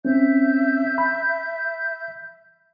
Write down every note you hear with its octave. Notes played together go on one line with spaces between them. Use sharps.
C4 C#4 E5 G6
B5